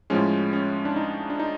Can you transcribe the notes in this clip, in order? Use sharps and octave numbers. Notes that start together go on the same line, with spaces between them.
A2 F3 G#3 C#4
C#4
D4
D#4
D4
D#4